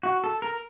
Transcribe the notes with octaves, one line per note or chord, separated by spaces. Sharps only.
F#4
A4
A#4